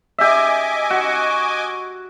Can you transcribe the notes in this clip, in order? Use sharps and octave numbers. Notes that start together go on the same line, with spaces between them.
G4 D#5 E5 G#5 D6
F#4